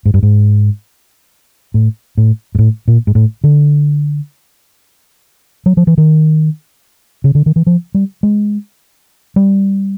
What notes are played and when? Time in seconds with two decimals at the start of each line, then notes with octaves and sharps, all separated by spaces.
0.06 G#2
0.14 G2
0.23 G#2
1.74 A2
2.17 A2
2.55 G#2
2.59 A2
2.88 A#2
3.07 G#2
3.15 A2
3.44 D3
5.66 F#3
5.77 F3
5.87 E3
5.98 D#3
7.24 C#3
7.35 D3
7.46 D#3
7.56 E3
7.67 F3
7.94 G3
8.23 G#3
9.36 G3